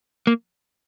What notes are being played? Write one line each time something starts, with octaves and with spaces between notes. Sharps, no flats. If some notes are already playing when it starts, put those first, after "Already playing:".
A#3